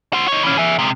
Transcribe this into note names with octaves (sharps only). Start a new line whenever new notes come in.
F#4 C5
D#4 C#5
E3 C#4
G#4 E5
C3 G#3